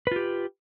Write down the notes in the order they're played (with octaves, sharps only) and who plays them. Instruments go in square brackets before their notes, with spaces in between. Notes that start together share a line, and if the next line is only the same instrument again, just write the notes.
[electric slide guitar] B4
F4
G4